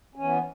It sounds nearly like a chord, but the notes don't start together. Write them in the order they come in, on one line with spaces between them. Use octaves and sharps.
C#4 E3 B3